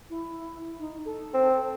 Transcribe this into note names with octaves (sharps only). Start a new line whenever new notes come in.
E4
D#4
A4
C4